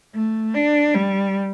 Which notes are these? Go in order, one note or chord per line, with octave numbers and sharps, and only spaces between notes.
A3
D4
G3